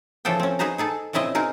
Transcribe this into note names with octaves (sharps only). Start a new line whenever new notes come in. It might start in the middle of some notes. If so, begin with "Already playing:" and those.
C#3 E3 F3 A4 C5 G5
C4 C#4
D#4 G#4 B4 C5 A#5
D#4 G#4 A4
A#2 C#3 C4 E4 D#5
C4 D#4 G#4 A#4